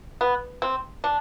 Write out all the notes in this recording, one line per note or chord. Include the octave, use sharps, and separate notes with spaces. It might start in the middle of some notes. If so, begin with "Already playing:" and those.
B3
C4
D4